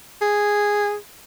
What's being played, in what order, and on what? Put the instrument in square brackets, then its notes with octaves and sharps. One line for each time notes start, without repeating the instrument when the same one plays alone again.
[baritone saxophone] G#4